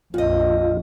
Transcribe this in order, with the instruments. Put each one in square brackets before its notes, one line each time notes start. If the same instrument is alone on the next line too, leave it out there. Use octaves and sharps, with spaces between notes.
[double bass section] A#1 F2 [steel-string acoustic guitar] A#2 D#5 [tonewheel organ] F4